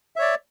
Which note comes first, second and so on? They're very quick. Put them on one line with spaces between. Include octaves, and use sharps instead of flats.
E5 C#5 D5